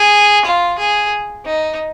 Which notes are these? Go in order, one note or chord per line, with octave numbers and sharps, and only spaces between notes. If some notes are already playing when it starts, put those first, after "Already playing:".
Already playing: G#4
F4
G#4
D#4